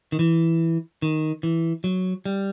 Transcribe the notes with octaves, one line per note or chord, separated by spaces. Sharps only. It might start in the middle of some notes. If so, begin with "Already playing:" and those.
D#3
E3
D#3
E3
F#3
G3